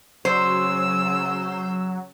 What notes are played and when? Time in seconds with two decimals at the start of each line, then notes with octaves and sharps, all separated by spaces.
0.25 C#3 F#3 C5 E6